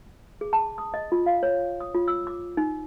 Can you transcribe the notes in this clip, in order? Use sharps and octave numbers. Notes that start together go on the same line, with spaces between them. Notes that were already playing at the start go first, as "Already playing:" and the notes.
G#4
A5
D#6
D#5
F4
F5
C#5
D#6
F4
E6
D6
D#4